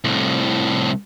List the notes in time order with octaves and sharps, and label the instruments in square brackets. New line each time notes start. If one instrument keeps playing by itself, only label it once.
[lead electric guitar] C2 A2